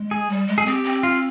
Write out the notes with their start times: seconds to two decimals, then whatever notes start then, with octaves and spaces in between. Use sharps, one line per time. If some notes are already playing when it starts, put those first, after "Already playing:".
Already playing: G#3
0.11 G#4
0.29 G3
0.48 G#3
0.58 G#4
0.66 C4 G4
0.84 C4
1.03 F4